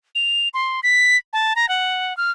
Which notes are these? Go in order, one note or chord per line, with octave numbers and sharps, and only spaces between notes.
F7
C6
B6
A5
A#5
F#5
F6